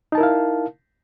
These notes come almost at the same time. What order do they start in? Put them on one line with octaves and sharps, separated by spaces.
D#4 A5 A#4 E4 F5